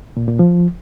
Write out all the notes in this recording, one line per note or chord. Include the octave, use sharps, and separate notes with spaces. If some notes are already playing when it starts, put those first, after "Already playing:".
A#2
A#2
F3